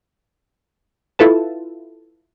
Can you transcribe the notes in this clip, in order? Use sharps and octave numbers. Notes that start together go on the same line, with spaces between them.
E4 F4 A4 B4 A5